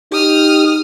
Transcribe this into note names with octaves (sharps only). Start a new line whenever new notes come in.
D#4 G4 D#6 F6